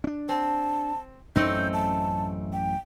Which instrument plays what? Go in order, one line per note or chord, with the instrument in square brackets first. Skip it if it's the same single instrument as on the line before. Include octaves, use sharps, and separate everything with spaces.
[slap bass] C#4 D4
[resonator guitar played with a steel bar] C4 [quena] A5
[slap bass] A1 F#2 C#4 [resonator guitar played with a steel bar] A3 C4 D#4 [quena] G6
[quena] A5
G5